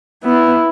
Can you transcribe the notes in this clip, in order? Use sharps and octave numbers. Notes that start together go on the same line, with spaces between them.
B3 E4